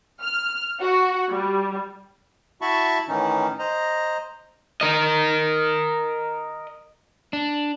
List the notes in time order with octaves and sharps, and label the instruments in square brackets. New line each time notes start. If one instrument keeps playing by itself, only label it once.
[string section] F6
F#4
G3
[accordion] E4 F#4 E5 A5 B5 C#6
A2 D#3 E3 C#4 D#4
C5 D#5 A#5
[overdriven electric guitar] A#4 D#5
[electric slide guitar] D4